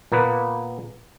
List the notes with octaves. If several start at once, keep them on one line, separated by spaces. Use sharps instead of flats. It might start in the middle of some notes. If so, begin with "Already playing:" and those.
A#2 A#3 B3 B4